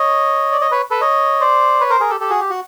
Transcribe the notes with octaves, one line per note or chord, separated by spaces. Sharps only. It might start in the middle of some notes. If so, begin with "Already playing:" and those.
Already playing: C#5 D#5
D5
C#5 D#5
B4 C#5
A4 B4
C#5 D#5
C5 D5
B4 C#5
A#4 C5
G#4 A#4
G4 A4
G4 A4
F#4 G#4
G4
F#4